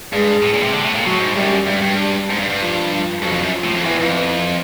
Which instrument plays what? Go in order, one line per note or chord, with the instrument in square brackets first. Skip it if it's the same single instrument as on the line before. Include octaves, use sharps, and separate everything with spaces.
[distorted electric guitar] G2 [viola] G#3
[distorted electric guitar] A2
A#2
C3
D3
A2
A#2
[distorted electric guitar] A2 [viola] F#3
[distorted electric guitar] G#2
[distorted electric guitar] F#2 [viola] G3
[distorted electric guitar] G2 [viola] G3
[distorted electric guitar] G2
G#2
G2
G2
[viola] F3
F3
[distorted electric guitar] F2 [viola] F#3
[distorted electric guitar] F2
F#2
[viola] F3
[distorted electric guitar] A2
F2
[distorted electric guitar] E2 [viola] E3
[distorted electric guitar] F2